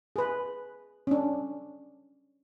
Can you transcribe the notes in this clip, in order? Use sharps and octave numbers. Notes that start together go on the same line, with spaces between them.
G#4 B4
C#4 D4